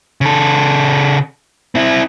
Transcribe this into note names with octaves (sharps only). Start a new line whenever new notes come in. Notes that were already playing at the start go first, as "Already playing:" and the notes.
C#3 A4
C4 E4